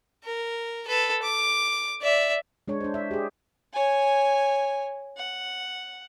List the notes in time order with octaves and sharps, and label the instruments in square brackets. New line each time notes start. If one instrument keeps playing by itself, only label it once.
[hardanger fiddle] A#4
A4 B4
D6
D5 E5
[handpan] G#3 D4 C#5
D4 C5
E5
G4 G#4
[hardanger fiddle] C#5 G#5
F#5